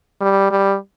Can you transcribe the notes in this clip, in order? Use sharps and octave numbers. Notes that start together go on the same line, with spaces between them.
G3
G3